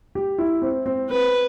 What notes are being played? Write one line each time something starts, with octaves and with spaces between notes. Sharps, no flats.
G4
E4
C4
C4
C4 B4